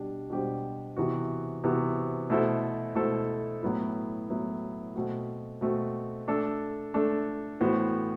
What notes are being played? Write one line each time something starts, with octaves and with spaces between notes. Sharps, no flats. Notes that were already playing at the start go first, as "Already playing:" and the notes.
Already playing: B2 G3 D4 G4
B2 G3 D4 G4 C5
C3 E3 B3 F#4
C3 E3 B3 F#4
B2 A3 E4 A4 C5
B2 A3 E4 A4 C5
A2 F#3 B3 E4
A2 F#3 B3 E4
B2 A3 C4 F#4
B2 A3 C4 F#4
A3 D4 A4
A3 D4 A4
A2 E3 B3 F#4 C5